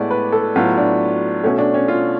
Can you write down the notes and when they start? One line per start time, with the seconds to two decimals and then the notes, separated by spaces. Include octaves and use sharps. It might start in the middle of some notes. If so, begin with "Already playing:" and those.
Already playing: A2 G#3 B3 D5
0.11 B4
0.32 A4
0.56 A2 F#3 B3 F4
0.78 D4
1.44 B2 A3 C#4
1.59 D4
1.74 C#4
1.88 F4